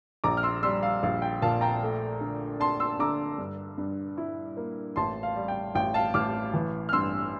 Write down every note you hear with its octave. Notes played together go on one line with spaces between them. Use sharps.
A#1 A#5 D6
F6
C6 E6
G3 C6 E6
F5
A#1 F5
G5
A#2 F5 A5
G5 A#5
A3
D3
D4 A5 C6
C6 E6
D3 A#5 D6
G2
G2
E4
A#3
A1 A5 C6
F5
G3
G5
A1 G5
F5 A5
A1 D6 F6
E3
F6
G2 C6 E6